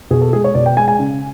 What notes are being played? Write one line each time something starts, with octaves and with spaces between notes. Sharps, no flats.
B2 G#4
A4
G#3 G#4
C#5
B2 D5
G5
G#3 G#5
G#5
C#3